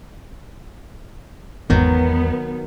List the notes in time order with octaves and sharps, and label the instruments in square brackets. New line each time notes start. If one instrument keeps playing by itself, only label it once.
[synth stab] G#1 [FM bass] E2 [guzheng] D#3 F#3 [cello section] B3